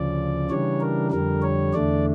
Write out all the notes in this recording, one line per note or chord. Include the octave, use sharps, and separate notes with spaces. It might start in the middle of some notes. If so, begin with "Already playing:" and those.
Already playing: D2 C#3 F3 D5
C#3 E3 G3 D4 C#5
A#4
F2 D3 G3 A#4
C#5
E2 D3 A3 D4 D5